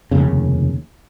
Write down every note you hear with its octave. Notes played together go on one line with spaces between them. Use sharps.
F1 A#1 D#2 C#3